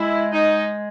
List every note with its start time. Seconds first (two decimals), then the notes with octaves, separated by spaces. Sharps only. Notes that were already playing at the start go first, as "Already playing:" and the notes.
Already playing: G#3 E4
0.33 D#4